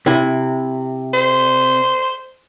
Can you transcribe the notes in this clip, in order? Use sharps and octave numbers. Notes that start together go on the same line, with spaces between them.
C3 E4
C5